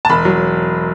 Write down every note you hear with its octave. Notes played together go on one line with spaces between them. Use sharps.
A5
E1 B5
F#3